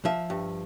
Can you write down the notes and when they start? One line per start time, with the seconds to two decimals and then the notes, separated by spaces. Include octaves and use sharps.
0.05 F3 E5
0.30 G2